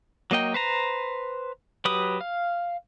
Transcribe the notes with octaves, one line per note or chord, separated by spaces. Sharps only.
F#3 A#3 D#5 G5
B4 C5 A#5
F#3 G4 B4 B5 D#6
F5